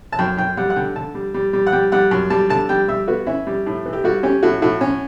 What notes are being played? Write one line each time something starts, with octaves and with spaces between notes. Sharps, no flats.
A5
F#2 G5
F#2 G5
G3 F#5
F#5
D3 G5
D3 A5
G3
G3
G3
F#5
G3 G5
G3 F#5
F#2
G3 A5
D3 A5
G3 G5
G3 E5
B3 F#4
C#4 E4
G3
A2
E3
G4
G3 F#4
C#4 G4
A2 F#4
A2 F#4
C#4